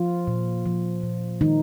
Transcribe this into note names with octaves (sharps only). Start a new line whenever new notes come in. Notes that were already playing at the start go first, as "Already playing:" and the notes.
Already playing: F3 F4
A#2
F3
A#2
D#3 G#3 D#4